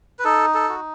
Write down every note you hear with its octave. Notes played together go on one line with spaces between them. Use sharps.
B4
D#4 A4
A4
F#4